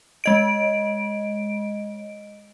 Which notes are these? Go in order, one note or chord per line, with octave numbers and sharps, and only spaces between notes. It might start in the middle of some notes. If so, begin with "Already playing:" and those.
G#3 D#5 D7